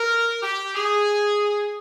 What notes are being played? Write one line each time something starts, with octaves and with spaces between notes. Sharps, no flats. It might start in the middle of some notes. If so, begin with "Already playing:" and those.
Already playing: A#4
G4
G#4